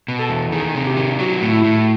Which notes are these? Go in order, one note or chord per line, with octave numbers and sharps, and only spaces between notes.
B2
A4
E2
D#3 G#4
C3
G4
D#3
F#3 F#4
A2
E4
A2